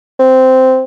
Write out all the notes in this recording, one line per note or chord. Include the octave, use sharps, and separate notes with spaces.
C4